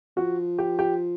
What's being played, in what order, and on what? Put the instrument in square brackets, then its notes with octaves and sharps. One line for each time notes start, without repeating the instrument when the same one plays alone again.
[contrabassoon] F3 [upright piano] F#4
[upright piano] G4
G4